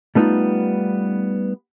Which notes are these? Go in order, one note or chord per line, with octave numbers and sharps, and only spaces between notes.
G3 A3 B3 D#4 F4